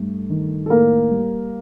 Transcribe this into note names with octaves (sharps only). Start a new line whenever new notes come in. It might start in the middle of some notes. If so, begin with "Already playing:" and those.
Already playing: G2 A3
D#3
A4
A2 A#3 A#4
G3